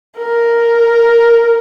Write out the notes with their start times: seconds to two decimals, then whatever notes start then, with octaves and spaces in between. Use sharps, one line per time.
0.18 A#4